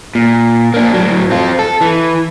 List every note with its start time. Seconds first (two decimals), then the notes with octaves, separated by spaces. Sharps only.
0.15 A#2
0.74 A#3 D4
0.93 A2 F#3
1.31 C4 F4
1.59 A4
1.81 E3